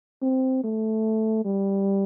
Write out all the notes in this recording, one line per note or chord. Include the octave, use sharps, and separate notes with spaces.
C4
A3
G3